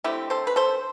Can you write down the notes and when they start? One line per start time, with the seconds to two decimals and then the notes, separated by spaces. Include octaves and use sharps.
0.04 D3 A3 C4 E4 G4
0.30 A4 C5
0.47 B4
0.56 A4 C5